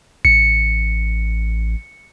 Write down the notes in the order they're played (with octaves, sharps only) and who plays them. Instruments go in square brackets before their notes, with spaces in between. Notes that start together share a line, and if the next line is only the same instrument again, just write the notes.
[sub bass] A1 [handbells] C#7